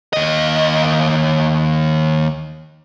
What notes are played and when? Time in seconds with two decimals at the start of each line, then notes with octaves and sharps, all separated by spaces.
0.13 D#2 D#5